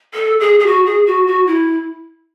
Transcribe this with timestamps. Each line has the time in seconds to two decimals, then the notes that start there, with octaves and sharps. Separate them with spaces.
0.14 A4
0.40 G#4
0.60 G#4
0.66 F#4
0.86 G#4
1.07 F#4
1.27 F#4
1.47 E4